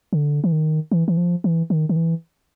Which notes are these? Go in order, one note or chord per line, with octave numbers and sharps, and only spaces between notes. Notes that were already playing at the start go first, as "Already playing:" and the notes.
D3
E3
D#3
E3
E3
F3
E3
D#3
D#3
E3